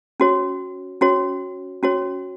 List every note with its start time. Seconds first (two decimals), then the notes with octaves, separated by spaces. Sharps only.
0.20 C#4 F#4 C#5
1.01 C#4 F#4 C#5
1.83 C#4 F#4 C#5